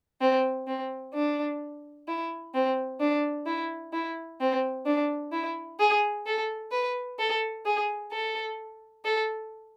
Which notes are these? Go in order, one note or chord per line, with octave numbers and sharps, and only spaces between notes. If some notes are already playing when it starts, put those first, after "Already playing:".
C4
C4
D4
E4
C4
D4
E4
E4
C4
D4
E4
G#4
A4
B4
A4
G#4
A4
A4